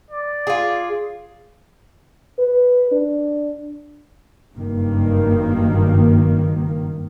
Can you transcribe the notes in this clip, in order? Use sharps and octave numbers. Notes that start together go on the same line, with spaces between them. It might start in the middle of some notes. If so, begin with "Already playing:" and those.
D5
F4 G#4
B4
D4
F#1 G2 D#3 A#3